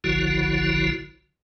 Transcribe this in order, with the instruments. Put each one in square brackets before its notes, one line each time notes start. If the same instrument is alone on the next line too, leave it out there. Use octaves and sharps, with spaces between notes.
[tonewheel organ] F#1 B1 D3 F3 E4 F#4